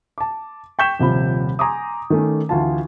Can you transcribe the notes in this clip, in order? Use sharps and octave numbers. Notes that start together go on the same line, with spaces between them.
A5 D6
G5 C#6 G6 B6 E7
D#1 C3 F3 B5
G#5 A#5 C6 D6 D#6
D#3 A3 C#4
D2 E3 F4 A5